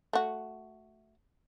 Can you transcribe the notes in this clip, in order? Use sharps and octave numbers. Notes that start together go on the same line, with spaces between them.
A3 F#4